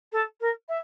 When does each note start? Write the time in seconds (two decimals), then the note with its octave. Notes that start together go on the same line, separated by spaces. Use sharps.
0.12 A4
0.40 A#4
0.68 E5